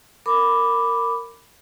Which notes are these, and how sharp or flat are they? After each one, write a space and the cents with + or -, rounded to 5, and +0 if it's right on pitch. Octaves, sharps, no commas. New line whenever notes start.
A#4 -20 B5 +5 D6 +0